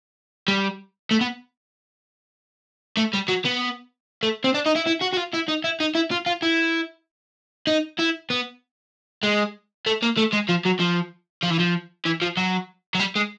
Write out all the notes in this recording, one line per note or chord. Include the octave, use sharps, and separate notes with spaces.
G3
A3
B3
A3
G3
F#3
B3
A3
C4
D4
D#4
E4
E4
F#4
F#4
F4
E4
D#4
E4
D#4
E4
F4
F4
E4
D#4
E4
B3
G#3
A3
A#3
A3
G#3
F3
F#3
F3
F3
E3
F3
E3
F3
F#3
F#3
G3
G#3